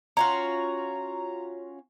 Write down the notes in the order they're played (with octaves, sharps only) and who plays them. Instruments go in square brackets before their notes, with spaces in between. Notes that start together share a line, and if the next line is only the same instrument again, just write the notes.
[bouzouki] C#4 F4 F#4 [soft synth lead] A#5